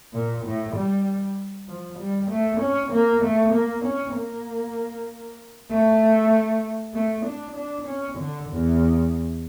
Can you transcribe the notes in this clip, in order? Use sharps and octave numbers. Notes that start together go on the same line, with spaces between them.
A#2
A2
G3
F3
G3
A3
C#4
A#3
A3
A#3
C#4
A#3
A3
A3
D4
D4
C#4
D3
E2